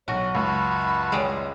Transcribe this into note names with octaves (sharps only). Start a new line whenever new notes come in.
B1 F#4 C#5
C#2 F#2 F#5 A5 B5 C#6
G3 G#3